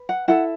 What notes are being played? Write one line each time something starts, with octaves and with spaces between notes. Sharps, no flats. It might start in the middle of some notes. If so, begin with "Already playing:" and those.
Already playing: B4
F#5
E4 A4 F#5